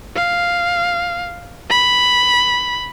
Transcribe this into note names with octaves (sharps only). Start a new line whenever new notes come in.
F5
B5